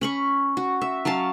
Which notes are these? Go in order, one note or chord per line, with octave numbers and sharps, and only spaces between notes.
C#4 B5 C#6
F#4
E5
F#3 C#4 F5 A5